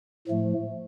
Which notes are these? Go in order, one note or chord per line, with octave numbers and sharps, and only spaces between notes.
A2 F3 A3